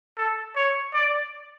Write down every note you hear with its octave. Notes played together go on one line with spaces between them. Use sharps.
A4
C#5
D5